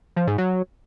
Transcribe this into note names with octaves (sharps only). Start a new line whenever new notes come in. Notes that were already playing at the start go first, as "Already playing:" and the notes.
F3
G#2
F#3